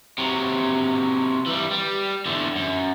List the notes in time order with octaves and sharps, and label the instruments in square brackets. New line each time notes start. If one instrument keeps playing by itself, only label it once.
[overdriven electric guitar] C3 F#3
E3 G3
G3
E2 D3
F#2